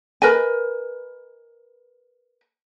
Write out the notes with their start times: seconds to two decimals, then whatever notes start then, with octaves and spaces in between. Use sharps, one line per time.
0.22 A#4 B4 D#5 G#5